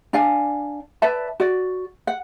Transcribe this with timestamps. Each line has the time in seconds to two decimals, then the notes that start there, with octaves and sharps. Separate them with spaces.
0.13 D4 D5 F5 G#5
1.02 B4 D5 E5 A5
1.40 F#4 D5
2.07 F#5